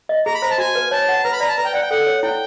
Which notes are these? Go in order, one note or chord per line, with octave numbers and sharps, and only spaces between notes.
D#5
G#4 A#5
B5
C5 A#5
A5
F#4 G#5
B4
C#5 A5
F#5
B4 A#5
B5
D5 A#5
A5
B4 A#5
G5
D5 F#5
G5
A4 F#5
C#5
E4 G5